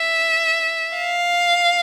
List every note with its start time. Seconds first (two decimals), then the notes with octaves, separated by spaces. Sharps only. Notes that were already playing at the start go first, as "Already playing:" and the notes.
Already playing: E5
0.98 F5